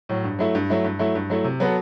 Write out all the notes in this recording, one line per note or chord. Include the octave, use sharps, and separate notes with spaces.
A2 F#3
G2
F#3 A3 E4
G2
F#3 A3 E4
G2
F#3 A3 E4
G2
F#3 A3 E4
C3
F#3 B3 F#4 A4